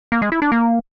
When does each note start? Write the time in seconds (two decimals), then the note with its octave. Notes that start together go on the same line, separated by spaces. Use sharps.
0.12 A#3
0.22 G#3
0.32 E4
0.42 D4
0.52 A#3